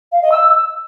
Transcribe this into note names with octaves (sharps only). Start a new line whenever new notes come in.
F5
D#5
E6